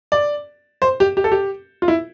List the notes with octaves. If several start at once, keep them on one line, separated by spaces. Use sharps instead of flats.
D5
C5
G4
G4
A4
G4
F4
E4